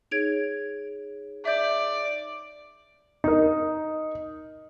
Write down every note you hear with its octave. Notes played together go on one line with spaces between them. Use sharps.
D#4 G#4 C#5 G#6 D7 F7
D5 E5 G6
D#4 A#4